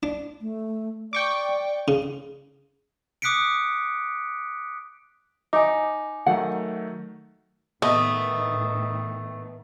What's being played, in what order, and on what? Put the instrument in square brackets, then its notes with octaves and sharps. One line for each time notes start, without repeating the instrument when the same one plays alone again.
[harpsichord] D4
[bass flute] A3
[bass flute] D5 [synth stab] G5 C#6 D6
[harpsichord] C#3 [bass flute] G#4
[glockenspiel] D6 D#6 F#6 B6 C#7 D7
[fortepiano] D#4 [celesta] G#5 D6
[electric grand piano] D#3 F#3 A3 [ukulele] F#5
[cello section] A2 D#3 [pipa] A3 [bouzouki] B3 [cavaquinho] D#5